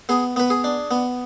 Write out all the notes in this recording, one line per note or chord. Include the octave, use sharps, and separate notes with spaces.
B3 G#4
B3 B4
G#4
D4
B3